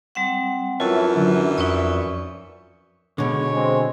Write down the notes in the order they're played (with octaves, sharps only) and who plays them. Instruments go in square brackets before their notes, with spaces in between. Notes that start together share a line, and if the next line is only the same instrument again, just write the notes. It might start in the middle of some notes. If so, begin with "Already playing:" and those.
[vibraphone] G3 C4 F#5
[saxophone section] F#2 E3 [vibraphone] F4 [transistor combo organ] C#5 E5 A5
[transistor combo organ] D3 F#3
D4
[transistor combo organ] F2 E5 C#6 [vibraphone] D#4 B4 D5
[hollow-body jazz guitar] B2 D3 [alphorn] G#3 [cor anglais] C#5
[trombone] G#3 [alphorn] C4